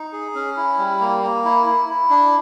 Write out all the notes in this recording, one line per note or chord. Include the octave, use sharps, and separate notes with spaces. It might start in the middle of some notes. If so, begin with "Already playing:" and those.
Already playing: D#4
G#4
C#4
E4
G3
A#3
A#3
E4
E4
E4
D4